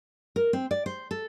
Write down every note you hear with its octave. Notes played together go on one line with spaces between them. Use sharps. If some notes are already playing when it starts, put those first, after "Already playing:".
A#4
C4
D5
C5
A4